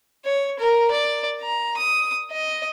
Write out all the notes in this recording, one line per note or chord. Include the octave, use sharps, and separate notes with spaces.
C#5
A#4
D5
A#5
D#6
D#5